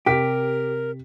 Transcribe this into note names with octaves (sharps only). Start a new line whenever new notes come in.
C3 G4 A#4 B6